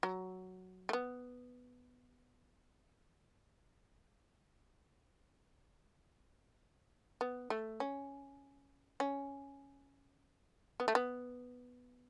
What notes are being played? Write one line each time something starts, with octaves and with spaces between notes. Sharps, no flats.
F#3
A3
B3
B3
A3
C#4
C#4
B3
A3
B3